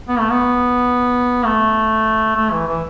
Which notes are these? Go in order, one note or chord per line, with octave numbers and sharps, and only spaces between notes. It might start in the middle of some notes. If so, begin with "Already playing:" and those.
B3
A3
B3
A3
A3
E3
E3